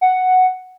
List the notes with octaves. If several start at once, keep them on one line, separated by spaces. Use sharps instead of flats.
F#5